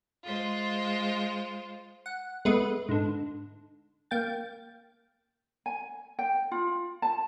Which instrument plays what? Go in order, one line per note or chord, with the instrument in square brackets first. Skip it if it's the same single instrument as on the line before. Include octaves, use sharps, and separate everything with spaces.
[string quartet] G#3 F4 C5
[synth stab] F#5
G#3 A3 B3 B4
G#2 D3
A#3 G5 A6
[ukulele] G#5
G5
F4
A5